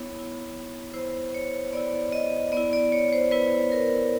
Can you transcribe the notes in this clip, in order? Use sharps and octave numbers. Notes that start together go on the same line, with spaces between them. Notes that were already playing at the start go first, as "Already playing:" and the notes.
Already playing: B3 E4 C#5
B3 E4
B3 E4 C5
C#5
B3 E4 D5
D#5
B3 E4 D5
D5
C#5
C5
B3 E4 B4
A#4